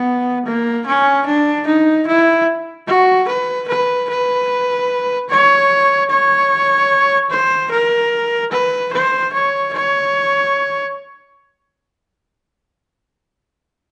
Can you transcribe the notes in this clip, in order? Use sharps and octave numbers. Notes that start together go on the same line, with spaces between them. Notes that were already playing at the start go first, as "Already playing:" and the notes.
Already playing: B3
A#3
C#4
D4
D#4
E4
F#4
B4
B4
B4
C#5
C#5
C5
A#4
B4
C5
C#5
C#5